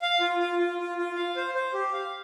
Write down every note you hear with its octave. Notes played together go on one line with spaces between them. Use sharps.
F5
F4
F4
F4
F4
F4
F5
C5
C5
G4
F5